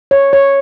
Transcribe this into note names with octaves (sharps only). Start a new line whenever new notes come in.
C#5
C#5